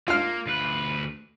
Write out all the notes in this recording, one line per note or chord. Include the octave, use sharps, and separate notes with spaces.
A#3 F4 F6
D2 B4